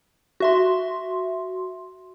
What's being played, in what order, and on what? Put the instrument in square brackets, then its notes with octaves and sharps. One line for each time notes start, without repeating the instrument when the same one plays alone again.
[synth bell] F#4 E5 C6